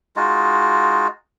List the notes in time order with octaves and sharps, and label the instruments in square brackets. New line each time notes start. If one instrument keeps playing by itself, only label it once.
[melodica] G#3 D#4 F4 F#4